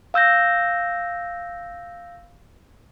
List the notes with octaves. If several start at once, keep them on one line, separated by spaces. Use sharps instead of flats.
F5 E6 G6 A#6